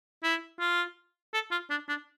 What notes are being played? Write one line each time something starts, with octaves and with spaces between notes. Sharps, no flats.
E4
F4
A4
F4
D4
D4